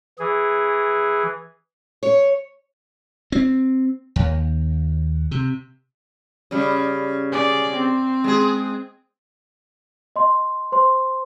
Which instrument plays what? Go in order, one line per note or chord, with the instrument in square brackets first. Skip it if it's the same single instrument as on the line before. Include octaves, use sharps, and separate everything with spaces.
[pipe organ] E3 G#4
[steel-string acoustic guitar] C#5
[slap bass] C4
D#2
C3
[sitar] C#3 G3
[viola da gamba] G#4 D5
C4
[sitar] G#3 G#4
[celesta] D#5 C6
C5 C6